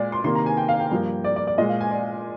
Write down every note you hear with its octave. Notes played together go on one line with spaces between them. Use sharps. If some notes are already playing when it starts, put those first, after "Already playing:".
Already playing: A#2 G#3 D5
C6
C3 D#3 A#3 C6
A#5
G#5
G5
F5
G5
G2 F3 A#3
D5
D5
D5
A#2 G#3 D#5
F5
G#5
D5